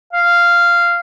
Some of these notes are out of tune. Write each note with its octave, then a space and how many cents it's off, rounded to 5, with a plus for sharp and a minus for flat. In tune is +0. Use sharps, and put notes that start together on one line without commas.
F5 -10